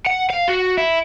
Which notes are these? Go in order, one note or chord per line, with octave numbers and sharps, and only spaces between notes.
F#5
F5
F#4
E4